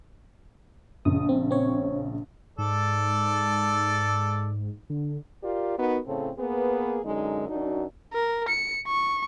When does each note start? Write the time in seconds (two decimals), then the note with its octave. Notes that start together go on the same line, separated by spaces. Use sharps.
1.05 A#1 C#3 D#6
1.29 C4
1.51 C4 C#5
2.58 G#2 A4 D5
4.90 D3
5.43 F4 G4 A#4 D5
5.78 B3 D#4 F#4 A#4
6.07 A2 C#3 C4 A4
6.38 A#3 B3 G#4 B4
7.05 F#2 D3 G#3 D#4
7.49 F#2 D4 D#4 F#4
8.13 A#4
8.49 C#7
8.87 C#6